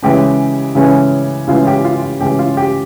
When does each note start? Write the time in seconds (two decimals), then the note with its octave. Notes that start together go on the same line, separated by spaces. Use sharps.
0.02 C#3 E3 G#3 C#4 G4
0.75 C#3 E3 G#3 C#4
1.48 C#3 E3 G#3 C#4 F4
1.67 G4
1.85 F4
2.03 F4
2.20 C#3 E3 G#3 C#4 G4
2.39 F4
2.57 G4